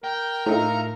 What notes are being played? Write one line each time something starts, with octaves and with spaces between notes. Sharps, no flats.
A#4 G5
A2 A3 D#4 F4 A#5